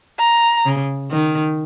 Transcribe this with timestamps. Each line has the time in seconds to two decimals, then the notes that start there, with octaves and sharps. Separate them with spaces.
0.19 A#5
0.66 C#3
1.11 D#3